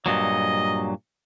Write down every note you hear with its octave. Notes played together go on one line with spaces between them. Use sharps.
G2 A#2 F#3 D#5